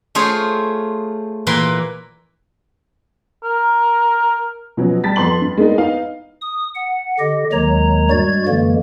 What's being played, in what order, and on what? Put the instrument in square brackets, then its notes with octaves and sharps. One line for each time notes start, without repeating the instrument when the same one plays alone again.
[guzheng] A3 F4 G#4 C5 C#5
A#2 E3 A#3 B4 C6
[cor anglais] A#4
[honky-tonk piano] B2 F3 F#3 B3 C#4
G3 A5 A6 B6
F2 B3 C6 F#7
G2
G#3 A#3 B3 D4 D#4
B3 D#4 F5
[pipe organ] D#6
F#5
D3 G4 D#5
D#2 D#3 F#3 G#3 C#5 A#5
G2 G3 G#3 F#4 D5 G#6
F#2 D3 E3 G#3 A#3